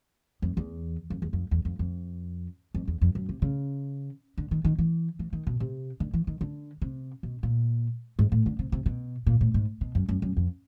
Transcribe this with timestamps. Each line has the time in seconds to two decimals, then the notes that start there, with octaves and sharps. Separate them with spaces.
0.42 F2
0.57 E2
1.10 F2
1.22 E2
1.33 F2
1.51 E2
1.65 F2
1.79 F2
2.75 F2
2.87 E2
3.01 F2
3.15 F#2
3.29 C3
3.42 C#3
4.38 D3
4.51 D#3
4.65 D#3
4.78 E3
5.19 E3
5.33 D#3
5.47 B2
5.60 C3
6.00 D3
6.14 E3
6.27 D#3
6.41 D3
6.82 C3
7.23 B2
7.43 A#2
8.19 G#2
8.32 A2
8.46 D3
8.59 C3
8.72 C3
8.86 B2
9.27 A#2
9.41 A2
9.54 G#2
9.81 B2
9.95 F#2
10.09 F#2
10.22 F#2
10.37 F2